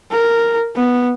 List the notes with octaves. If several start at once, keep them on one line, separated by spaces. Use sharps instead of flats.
A#4
B3